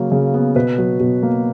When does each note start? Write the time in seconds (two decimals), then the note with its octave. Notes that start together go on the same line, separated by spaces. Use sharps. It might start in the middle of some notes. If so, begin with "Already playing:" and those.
Already playing: C#3 F#3 A#3
0.12 C#3
0.34 B3
0.55 B2 B4
0.78 F#3
1.00 B2
1.23 A#3